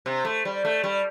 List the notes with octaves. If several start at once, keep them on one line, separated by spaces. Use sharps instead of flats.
C3
A3
G3
A3
G3